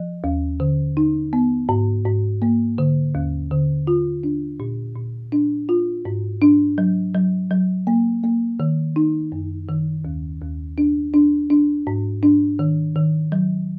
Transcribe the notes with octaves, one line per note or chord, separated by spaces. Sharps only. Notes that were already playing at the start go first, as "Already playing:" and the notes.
Already playing: F3
D#2
D3
D#4
B3
G#2
G#2
A#3
D3
D#2
D3
F4
D4
A#2
A#2
D4
F4
G#2
D4
F#3
F#3
F#3
A#3
A#3
D#3
D#4
F#2
D#3
D#2
D#2
D4
D4
D4
G#2
D4
D#3
D#3
F#3